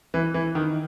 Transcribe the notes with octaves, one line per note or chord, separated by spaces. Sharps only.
E3
E3
D#3